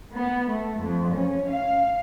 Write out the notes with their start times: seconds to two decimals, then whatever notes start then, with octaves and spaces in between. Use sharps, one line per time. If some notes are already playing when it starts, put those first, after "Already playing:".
0.15 B3
0.50 A3
0.81 F2
1.16 C#4
1.51 F5